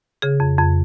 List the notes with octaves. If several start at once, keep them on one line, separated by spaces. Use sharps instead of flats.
C#3 G#4
F2
F2